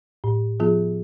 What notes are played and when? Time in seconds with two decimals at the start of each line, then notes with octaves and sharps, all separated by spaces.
0.24 A2
0.60 F3 B3 F4 G#4